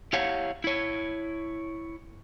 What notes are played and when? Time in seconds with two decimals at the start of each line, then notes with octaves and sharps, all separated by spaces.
0.13 E4 G4 C#5 F5 F#5
0.64 E4 C#5